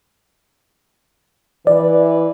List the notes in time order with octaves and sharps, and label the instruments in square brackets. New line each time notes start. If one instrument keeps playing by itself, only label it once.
[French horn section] E3 B4 [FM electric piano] D5